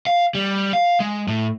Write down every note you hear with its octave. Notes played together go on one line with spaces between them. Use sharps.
F5
G3
F5
G#3
A2